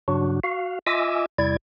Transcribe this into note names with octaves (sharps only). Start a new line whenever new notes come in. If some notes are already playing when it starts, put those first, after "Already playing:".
G2 C#3 F#3 D4 F#4
F#4 F5
F4 D#5 E5 G#5 D6 E6
E2 C3 G3 E4 D5 G#6